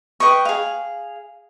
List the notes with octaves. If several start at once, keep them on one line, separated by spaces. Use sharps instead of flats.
B4 D#5 G5 C#6
G#4 F5